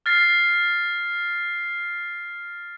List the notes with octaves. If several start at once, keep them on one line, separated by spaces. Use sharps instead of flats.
F6 A6 C7